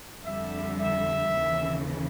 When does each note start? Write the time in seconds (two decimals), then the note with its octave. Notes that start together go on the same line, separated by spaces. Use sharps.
0.25 F2 D3 G3 E5
0.80 E5
1.34 D#2 C#3 E3